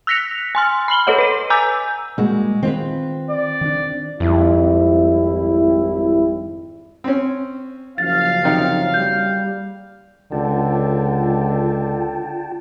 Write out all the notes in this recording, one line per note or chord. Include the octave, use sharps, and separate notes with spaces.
E6 F#6 A#6 B6 C#7 F7
G#5 C6 F6
B5 F6 F#7 G7
A4 B4 C#5 D#5 F#5
B4 D#7
G#5 A#5 D6 E6 G6
A#2 G3 G#3 A#3 F#4
D#3 C4 F4 B4
D5
D#3 D4
G#1 F2 G3 E4
C4 C#4
F#1 F3 F5 A6
C3 D#3 D#4
G3 G6
C#2 D3 F4 G5 A5